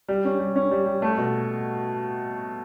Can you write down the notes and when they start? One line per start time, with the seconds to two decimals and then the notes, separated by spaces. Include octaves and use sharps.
0.08 G3
0.25 C#4
0.39 G3
0.56 C#4
0.71 G3
0.86 G3
1.02 A3
1.18 B2